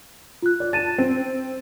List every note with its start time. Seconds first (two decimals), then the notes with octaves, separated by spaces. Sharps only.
0.42 F4 F#6
0.60 D5
0.73 A5 A6 D#7 E7
0.98 C4